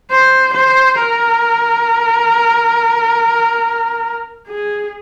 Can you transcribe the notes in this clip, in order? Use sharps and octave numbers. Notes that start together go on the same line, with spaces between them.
C5
C5
A#4
G#4